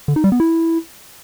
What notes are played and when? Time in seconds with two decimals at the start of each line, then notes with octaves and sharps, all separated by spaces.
0.08 D3
0.16 D#4
0.24 G3
0.32 B3
0.40 E4